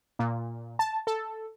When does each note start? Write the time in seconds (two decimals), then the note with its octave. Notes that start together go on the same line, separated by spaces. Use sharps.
0.19 A#2
0.79 A5
1.07 A4